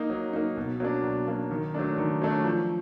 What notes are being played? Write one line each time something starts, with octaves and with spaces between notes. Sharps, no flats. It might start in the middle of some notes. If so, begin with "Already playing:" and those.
Already playing: A#3 D#4
F#3
A#3 D#4
B2
F#3 A#3 D4
B2
F#3 A#3 D4
D#3
F#3 A3 D4
D#3
F#3 A3 D4
F3